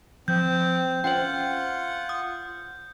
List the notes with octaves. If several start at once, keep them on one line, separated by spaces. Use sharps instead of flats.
F3 C4 G6
C#4 F4 C5 F#5 G5
D#6